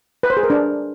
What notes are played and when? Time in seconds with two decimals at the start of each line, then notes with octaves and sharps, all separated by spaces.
0.23 B4
0.30 C5
0.37 G#4
0.43 A#4
0.50 D4